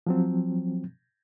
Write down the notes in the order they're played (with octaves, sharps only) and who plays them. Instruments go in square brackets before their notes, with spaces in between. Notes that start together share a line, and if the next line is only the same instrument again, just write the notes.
[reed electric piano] F3 F#3 C4